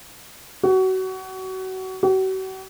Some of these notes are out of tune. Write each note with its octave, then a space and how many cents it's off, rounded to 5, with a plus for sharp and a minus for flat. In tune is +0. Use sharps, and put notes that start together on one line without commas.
F#4 +25
F#4 +40